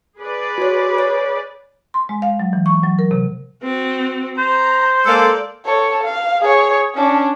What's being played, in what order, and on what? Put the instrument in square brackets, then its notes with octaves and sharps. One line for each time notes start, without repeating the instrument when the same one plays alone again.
[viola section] G#4 B4 D5
[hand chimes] F#4 C#5
C#5
[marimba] C6
G#3
F5
F#3
E3
C#6
F#3
A#4
C3
[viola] C4 F#4
[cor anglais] C5 [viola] A#5
[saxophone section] G#3 A#3 A4 [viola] D5
[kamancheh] A4 C#5
F5
G#4 C#5
C#4 D4